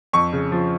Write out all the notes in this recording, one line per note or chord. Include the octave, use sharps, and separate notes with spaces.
F2 C#6
C#3
F3